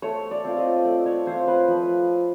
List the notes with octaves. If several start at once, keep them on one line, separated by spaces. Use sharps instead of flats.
A3 C#5
D5
C4 F4
D#5
A3 D5
C#5
C4 F4 C5
B4
F3